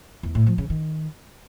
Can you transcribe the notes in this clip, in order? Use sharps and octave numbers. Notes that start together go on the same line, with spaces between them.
E2
A2
F3
C#3
D#3